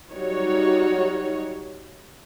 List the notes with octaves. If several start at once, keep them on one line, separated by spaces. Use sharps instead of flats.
F#3 G3 D#4 F#4 C#5